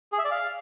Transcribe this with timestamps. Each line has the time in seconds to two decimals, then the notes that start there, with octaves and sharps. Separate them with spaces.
0.12 G#4
0.19 E5
0.25 D5
0.31 F5